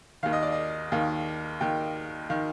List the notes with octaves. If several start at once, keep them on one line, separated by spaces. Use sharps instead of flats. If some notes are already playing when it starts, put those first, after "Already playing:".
D#2 D#3 F5
D#5
D5
D#5
D#2 D#3 F5
D#2 D#3 G5
D#3 F5